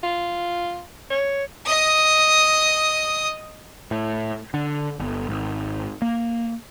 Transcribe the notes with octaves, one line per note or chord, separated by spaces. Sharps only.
F4
C#5
D#5 D#6
A2
D3
G1
G#1
A#3